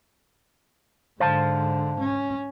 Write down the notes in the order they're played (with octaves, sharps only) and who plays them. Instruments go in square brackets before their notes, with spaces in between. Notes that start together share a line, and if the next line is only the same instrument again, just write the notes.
[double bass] G#2 D3 [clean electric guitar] C5 F5 A5
[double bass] C#4